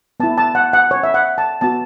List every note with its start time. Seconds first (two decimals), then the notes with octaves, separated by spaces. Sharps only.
0.20 B3 E4 A5
0.38 A5
0.55 F#5
0.73 F#5
0.91 C#5
1.03 E5
1.14 F#5
1.38 A5
1.61 B3 F#4 A5